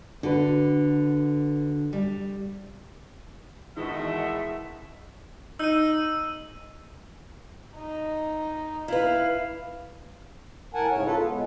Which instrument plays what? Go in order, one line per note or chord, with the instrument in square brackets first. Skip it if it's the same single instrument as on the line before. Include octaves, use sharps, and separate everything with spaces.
[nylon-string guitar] D3 [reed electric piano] D4 F#4 B4
[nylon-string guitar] G3
[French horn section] B2 D#3 [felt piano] E3 [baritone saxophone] G#3 [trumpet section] A3 E5
[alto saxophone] D#4 [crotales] E6 D#7
[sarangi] D#4
[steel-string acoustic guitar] E4 B4 [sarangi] F5
[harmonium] A2 A#4 F#5 G#5 A5
G#2 C#3 C#5
F4 A4 B4
B3
G#3